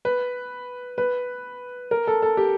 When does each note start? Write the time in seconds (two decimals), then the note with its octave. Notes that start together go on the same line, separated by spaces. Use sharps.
0.05 B4
0.98 B4
1.91 A#4
2.07 A4
2.22 A4
2.37 G4